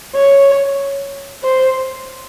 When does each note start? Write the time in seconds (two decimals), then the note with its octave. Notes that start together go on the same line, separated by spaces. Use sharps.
0.15 C#5
1.43 C5